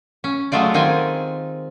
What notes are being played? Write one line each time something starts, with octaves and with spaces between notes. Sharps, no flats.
C#4
F#3 G#3 A3 F4 D5
D#3 C4 F4 G#5